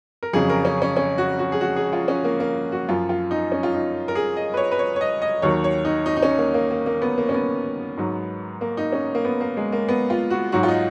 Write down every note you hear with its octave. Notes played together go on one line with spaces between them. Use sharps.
A#4
F2 C#3 F#3 G#4
A#4
C#4
C#4
C#4
F#4
F#4
G#4
F#4
G#4
F4
C#4
A#3
A#3
F#4
F#2 F3 F4
F4
D#4
C#4
F4
D#4
A#4
G#4
D#5
B4
C#5
B4
C#5
C#5
D#5
D#5
D#2 D#3 F#3 C#5
C#5
D#4
D#4
D#4
C#4
A#3
A#3
A#3
A#3
B3
A#3
C#4
B3
G#2 F#3
A#3
D#4
C#4
A#3
B3
A#3
G#3
A#3
B3
F4
F#4
G#2 F#3 F#4
F4
D#4